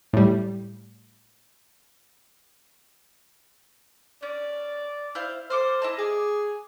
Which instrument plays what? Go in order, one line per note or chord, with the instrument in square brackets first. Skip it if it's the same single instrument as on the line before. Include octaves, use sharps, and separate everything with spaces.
[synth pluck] A2 G3
[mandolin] C#4 [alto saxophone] D5
[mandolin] E4 C5 F5
[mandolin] A4 D6 F6 [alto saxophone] C5
[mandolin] E4 D#5 A5
[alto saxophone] G#4 [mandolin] D6